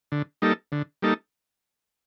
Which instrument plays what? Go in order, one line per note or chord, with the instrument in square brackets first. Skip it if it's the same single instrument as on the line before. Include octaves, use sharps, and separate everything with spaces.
[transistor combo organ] D3
G3 A#3 D#4 A4
D3
G3 A#3 D#4 A4